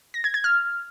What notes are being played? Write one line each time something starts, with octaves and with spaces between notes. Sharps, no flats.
A#6
G#6
G#6
F6